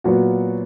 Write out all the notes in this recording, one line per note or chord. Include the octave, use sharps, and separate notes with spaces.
A#2 F#3 B3 F#4